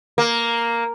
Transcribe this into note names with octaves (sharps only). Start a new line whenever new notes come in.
A#3